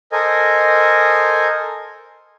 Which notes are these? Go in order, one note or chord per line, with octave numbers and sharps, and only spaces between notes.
A4 A#4 C5 D#5 G#5